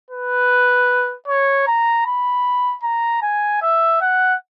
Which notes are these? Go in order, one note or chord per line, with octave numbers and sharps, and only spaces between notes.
B4
C#5
A#5
B5
A#5
G#5
E5
F#5